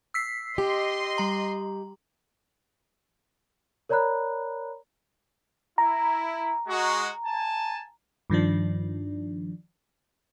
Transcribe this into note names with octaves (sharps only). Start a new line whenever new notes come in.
E6 B6 C7
G4 D#5 C6
G3 A#5
A#4 C#5 D5 A#5 B5 F#6
E4 A#5
G#3 F#4
G#5 A5
G2 D#3 F3 D4